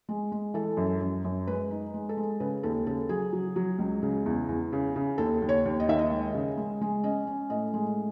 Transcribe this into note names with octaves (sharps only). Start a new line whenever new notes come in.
G#3
G#3
E3 A4
F#2
F#2
F#2
G#3 B4
D#4
G#3
A4
G#3
C#3 B4
D#2 A4
C#3 A4
F#3 G#4
F#3
F#3
C#2
C#3
E2
E2
C#3
C#3
D#2 A4
D#2
C#5
D#2
D#5
D#3 E5
D#5
G#3
C#3
G#3
G#3
C#4 D#5
C#4
A2 D#5
G#3